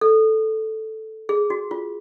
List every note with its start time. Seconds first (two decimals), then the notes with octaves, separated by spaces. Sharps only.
0.01 A4
1.29 G#4
1.50 F#4
1.71 F4